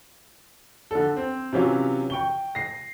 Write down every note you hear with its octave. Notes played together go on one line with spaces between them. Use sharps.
D3 A4
C4
C3 E3 F#3 C#4 F4
G5 C#6 G7
A#6 C7